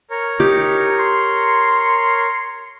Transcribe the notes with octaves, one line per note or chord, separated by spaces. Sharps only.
A#4 C#5
D#4 G4
C6